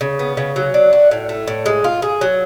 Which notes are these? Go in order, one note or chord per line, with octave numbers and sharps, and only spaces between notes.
C#3
B3
C#3
F#3
D4
F#4
A2
A3
A2
G#3
F4
G#4
F#3